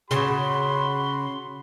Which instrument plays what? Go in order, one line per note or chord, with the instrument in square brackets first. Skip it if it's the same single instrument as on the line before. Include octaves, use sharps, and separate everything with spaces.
[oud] C#3 [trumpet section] F#4 B5 [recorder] C6